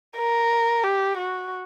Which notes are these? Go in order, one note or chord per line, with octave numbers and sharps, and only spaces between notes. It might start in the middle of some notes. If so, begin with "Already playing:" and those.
A#4
G4
F#4